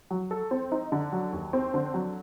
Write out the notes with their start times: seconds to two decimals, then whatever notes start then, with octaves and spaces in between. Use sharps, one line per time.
0.11 F#3
0.31 A4
0.51 C4
0.72 D#4
0.92 D3
1.12 F#3
1.33 D#2
1.53 C4
1.74 D3
1.94 F#3